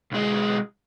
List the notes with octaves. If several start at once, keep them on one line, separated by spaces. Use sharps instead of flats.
B1 G#3